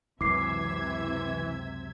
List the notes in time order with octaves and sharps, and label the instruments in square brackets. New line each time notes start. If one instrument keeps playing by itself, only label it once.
[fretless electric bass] C#2 F#2 [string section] C3 E5 G#6 [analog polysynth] E3 [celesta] D6 C7